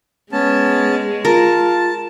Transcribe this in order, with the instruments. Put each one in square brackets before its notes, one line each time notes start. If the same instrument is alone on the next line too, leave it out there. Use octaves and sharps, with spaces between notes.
[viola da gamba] G#3 [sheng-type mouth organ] B3 C#4 A5
[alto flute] F4 [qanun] A#4 [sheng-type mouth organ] A5